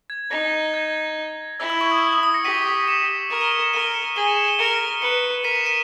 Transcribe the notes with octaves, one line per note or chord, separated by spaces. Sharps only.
G#6
D#4 A#6
G#6
E4 E6
E6
C#6
D#6
C#6
D#6
D#6
D#6
A#6 C#7
G4 B6 D#7
C#7 E7
A#4
D#7 G7
C#7 E7
C#7 E7
A#4 D#7 G7
C#7 E7
G#4 D#7 G7
C#7 E7
C#7 E7
D#7 G7
A#4 C#7 E7
B4 C#7 E7
A#4 B6 D#7
C#7 E7
B6 D#7